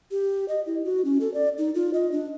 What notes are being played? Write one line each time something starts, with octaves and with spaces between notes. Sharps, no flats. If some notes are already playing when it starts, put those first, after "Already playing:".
G4
D#5
E4
F#4
C#4
A4
D5
D#4
F4
D#5
D4